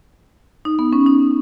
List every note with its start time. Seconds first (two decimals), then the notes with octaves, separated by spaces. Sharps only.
0.65 D#4
0.79 B3
0.93 C#4
1.07 D#4